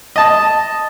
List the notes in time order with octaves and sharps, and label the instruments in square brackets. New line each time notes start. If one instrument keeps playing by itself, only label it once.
[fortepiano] D#5 A5